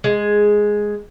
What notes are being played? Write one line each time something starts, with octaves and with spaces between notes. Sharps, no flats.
G#3